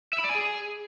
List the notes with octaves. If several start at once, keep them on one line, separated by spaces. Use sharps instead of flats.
E5
B5
D5
G#5
G#4